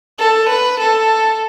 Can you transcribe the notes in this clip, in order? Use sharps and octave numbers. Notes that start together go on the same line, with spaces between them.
A4
B4
A4